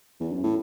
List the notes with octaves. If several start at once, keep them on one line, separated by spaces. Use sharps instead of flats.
E2
F#2
A2